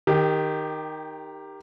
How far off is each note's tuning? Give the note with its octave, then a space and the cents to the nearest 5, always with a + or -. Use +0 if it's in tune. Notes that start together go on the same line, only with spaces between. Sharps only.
D#3 +0 G4 +15